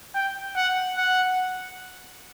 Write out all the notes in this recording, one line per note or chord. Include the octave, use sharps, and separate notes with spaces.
G5
F#5
F#5